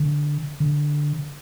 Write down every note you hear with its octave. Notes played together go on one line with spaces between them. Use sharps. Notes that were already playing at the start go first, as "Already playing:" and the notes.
Already playing: D3
D3